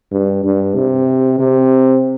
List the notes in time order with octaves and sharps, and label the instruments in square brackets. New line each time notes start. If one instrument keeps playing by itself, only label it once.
[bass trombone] G2
G2
C3
C3